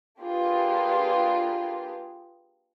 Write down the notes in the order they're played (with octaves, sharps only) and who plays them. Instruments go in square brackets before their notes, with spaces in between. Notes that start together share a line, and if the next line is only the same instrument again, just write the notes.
[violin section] A#3 D4 F4 G4 G#4 B4